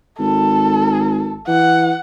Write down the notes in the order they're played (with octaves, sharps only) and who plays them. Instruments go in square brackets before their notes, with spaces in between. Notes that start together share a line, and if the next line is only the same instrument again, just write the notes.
[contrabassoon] G#1 [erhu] A4
[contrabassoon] E3 [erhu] F#5